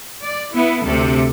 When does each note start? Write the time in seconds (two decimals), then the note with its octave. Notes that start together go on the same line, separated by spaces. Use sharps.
0.23 D5
0.54 B3 E4
0.83 D2 C3 A4